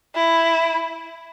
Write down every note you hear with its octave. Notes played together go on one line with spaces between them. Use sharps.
E4